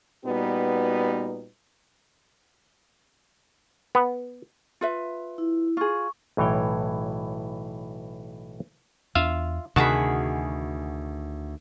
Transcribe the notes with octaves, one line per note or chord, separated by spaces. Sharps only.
A#2 G3 B3 D#4 F#4 B4
B3
F4 B4 E5
E4
F4 G#4 C#6
B1 A2 E3 C#5 G5
E2 D4 F4 E5 F5
D2 C3 D#3 F#4 G#4 A5 B5